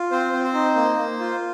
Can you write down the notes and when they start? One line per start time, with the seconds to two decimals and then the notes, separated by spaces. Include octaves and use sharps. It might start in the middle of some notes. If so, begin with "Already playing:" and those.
Already playing: F4
0.11 C4 C5
0.33 C4
0.44 C5
0.54 D#4
0.75 A#3
0.98 A#3
1.19 F4